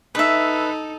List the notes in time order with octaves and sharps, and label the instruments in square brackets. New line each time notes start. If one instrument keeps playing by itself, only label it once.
[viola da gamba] D#4 A4 [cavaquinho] B4 E5